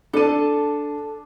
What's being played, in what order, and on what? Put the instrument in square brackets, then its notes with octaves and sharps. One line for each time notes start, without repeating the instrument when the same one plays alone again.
[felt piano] D4 D#7 [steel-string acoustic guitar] A4 A5